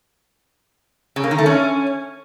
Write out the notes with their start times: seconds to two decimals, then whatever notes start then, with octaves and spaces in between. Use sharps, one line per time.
1.16 C#3
1.24 A#3
1.31 D#3
1.38 A3
1.46 C#4